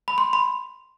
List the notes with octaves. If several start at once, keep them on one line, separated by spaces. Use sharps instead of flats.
B5
C6
B5